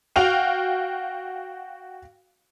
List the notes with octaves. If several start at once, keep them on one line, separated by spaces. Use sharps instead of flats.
F#4 F5 G5 F7